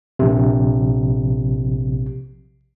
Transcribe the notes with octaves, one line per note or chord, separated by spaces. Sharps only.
A#1 C3